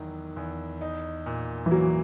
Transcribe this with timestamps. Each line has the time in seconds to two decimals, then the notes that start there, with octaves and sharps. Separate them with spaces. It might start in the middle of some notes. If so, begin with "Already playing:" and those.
Already playing: E2 D#3 F#3
0.36 E2
0.81 D#4
1.26 A#2
1.66 E3
1.71 F#3 A#3